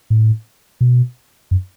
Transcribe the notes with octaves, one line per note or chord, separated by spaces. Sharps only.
A2
B2
F#2